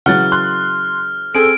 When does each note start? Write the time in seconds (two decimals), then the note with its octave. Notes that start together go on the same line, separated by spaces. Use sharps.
0.06 C#3 E3 F#3 F#5 F6 A6
0.32 C6 F#6
1.35 C4 G#4 A4 D7